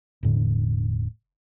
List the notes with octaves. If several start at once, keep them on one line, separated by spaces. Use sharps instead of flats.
E1 A2 D3